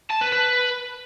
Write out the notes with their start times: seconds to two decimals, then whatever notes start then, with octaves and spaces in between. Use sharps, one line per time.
0.10 A5
0.22 B4
0.33 B4